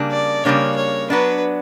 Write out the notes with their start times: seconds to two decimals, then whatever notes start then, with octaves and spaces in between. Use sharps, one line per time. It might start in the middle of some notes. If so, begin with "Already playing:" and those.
Already playing: C#3 G3 A#3 D4
0.11 D5
0.44 C#3 G3 A#3 D4 C#5
0.77 C#5
1.10 F#3 B3 D4 B4